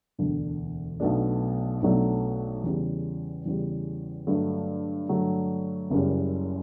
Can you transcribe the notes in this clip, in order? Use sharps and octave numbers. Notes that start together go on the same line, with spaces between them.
E1 D2 D3
B1 B2 F#3 A3 D4
B1 B2 F#3 A3 D4
E2 C#3 G3
E2 C#3 G3
G2 D3 F#3 A3
G2 D3 F#3 A3
F#1 F#2 C#3 G3